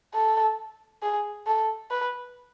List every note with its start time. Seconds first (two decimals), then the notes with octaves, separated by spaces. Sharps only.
0.14 A4
1.02 G#4
1.47 A4
1.90 B4